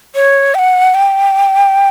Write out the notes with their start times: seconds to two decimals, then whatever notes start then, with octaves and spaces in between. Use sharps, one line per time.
0.15 C#5
0.54 G5
0.59 F#5
0.94 G5